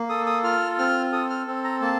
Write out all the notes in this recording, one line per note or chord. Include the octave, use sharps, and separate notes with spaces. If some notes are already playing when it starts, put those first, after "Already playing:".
Already playing: A#3
A4 D#6
D#6
F4 F6
C4 F6
A4 D#6
F6
C4
A#5
A#3 A5